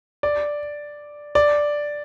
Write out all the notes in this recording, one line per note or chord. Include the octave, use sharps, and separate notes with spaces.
D5
D5